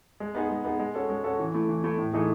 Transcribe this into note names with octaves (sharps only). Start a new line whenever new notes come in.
G#3
B3 D#4 G#4
G#3
B3 D#4 G#4
G#3
C#4 F#4 A4
G#3
C#4 F#4 A4
E3
A3 E4
E3
A3 E4
A2
E3 A3 D#4 G#4